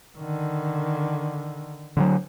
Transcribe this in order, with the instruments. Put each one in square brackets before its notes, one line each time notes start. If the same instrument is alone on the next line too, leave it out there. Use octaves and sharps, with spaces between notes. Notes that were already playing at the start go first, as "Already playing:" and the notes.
[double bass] D3 D#3
[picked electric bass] D3 D#3 F#3